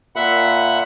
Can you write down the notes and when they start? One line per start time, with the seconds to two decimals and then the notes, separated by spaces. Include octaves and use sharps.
0.16 A#2 E5 F#5 B5